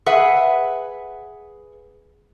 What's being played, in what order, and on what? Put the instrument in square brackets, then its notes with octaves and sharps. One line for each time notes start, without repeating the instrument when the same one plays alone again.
[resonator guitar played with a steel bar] G#4 B4 E5 F#5